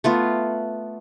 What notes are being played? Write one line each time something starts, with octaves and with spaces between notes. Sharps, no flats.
A3 B3 F4